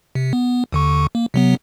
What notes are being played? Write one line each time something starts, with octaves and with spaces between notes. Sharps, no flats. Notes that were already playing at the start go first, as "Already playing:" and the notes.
C3
B3
D#2 D3 C#6
A#3
C3 F#3 B3